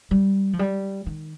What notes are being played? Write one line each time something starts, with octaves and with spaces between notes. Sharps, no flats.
G3
F3
G3
D#3